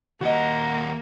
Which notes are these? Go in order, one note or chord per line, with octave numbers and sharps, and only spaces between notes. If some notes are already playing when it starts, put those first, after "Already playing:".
D#2 A#3 F#4 D#5 F#5